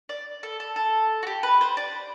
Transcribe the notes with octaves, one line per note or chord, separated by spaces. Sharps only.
D5
A4
A4
A4
F#4
G4
B4
C5
D5